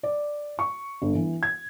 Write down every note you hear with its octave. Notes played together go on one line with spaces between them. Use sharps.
D5
C#6
G1
E3
G#6